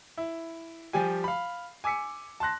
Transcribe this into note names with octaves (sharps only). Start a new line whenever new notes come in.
E4
F3 G3 G4 G#5
F5 B5
G#5 D6 E6 B6 C#7
A5 C6 F#6 A#6